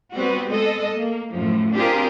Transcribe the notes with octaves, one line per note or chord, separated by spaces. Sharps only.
G3 B3 C4 F#4 B4
G#3 A4 D#5
A#3
F#2 A2 F3
C4 D4 F4 G4 G#4 A#4